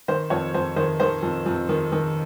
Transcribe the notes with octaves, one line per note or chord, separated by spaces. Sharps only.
D#3 C5
F2 C#5
F2 C5
D#3 C5
D#3 C5
F2
F2
D#3
D#3